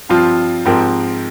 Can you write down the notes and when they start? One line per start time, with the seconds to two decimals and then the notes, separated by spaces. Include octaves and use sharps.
0.09 G2 F3 C4 F4
0.65 G#2 F3 C4 G4 A#4